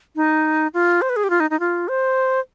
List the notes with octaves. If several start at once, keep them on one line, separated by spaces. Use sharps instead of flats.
D#4
F4
C5
B4
G#4
G4
F4
D#4
D#4
F4
C5